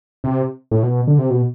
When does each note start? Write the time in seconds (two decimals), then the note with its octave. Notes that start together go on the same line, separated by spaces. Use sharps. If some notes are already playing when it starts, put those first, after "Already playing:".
0.24 C3
0.71 A2
0.83 B2
1.08 D3
1.19 C3
1.30 B2